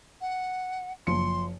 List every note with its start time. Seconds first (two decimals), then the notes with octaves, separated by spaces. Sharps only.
0.21 F#5
1.07 F#1 F3 C6 C#7